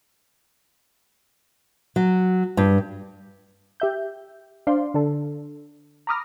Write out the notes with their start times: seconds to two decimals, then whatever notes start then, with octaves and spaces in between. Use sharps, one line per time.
1.96 F#3
2.57 G2
3.80 G4 E5 G6
4.67 D4 C5 D5 F5 C6
4.94 D3 D4 A4
6.07 A#5 B5 D6 D#6 F6 A#6